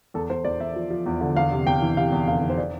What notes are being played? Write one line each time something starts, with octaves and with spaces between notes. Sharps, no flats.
E2 A4
E2 C5
E2 D5
E2 E5
F3
F3
E2
D3
E2 F5
C3
E2 G5
E3
C3 F5
E2
F1 F5
C3
C5
D5